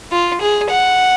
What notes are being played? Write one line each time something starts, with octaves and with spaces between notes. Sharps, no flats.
F4
G#4
F#5